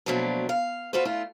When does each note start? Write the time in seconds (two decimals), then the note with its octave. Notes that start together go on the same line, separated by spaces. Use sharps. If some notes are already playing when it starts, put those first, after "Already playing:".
0.06 B2 F3 F#3 A3 A#3 D4
0.49 F5
0.93 F4 F#4 A4 B4 C5
1.05 A3 E4 F4